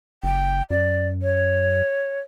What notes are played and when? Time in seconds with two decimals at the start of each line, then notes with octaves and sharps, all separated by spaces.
0.23 F#1 G5
0.70 F#2 D5
1.22 C#5